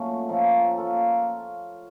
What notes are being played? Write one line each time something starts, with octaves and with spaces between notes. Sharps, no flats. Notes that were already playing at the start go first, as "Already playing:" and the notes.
Already playing: A#2 F#3 A3 C#4
F3 A#3 C#4 A4
A#3 F4 A4